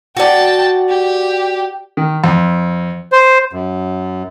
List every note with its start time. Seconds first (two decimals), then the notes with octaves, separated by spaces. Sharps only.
0.17 F#4 D5 G5 A5
0.89 G4
1.97 D#3
2.24 F2
3.12 C5
3.53 F#2